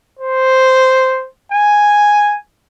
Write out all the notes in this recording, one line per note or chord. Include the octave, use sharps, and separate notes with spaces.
C5
G#5